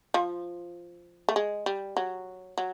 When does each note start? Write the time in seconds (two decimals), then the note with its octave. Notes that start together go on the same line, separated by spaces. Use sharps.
0.14 F3
1.29 A3
1.36 G#3
1.66 G3
1.97 F#3
2.58 F#3